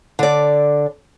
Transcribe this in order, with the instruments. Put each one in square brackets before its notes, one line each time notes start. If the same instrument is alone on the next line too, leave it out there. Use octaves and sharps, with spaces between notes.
[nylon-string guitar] D3 D5